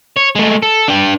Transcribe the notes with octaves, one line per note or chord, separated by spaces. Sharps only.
C#5
G#3 A3
A4
D4 G5